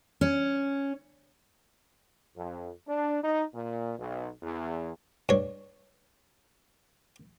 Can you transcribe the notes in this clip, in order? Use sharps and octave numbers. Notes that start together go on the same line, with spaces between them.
C#4
F2
D4
D#4
A#2
B1
E2
G2 C#5